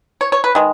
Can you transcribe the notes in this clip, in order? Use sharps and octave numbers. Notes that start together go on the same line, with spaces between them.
C#5
C#5
B4
D#3 G#3